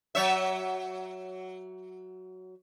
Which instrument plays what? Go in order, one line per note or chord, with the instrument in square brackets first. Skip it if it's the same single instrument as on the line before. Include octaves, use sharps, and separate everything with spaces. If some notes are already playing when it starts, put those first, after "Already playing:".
[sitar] F#3 C#5 E5